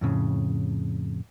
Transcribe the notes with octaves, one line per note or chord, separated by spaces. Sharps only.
F2 A2 C#3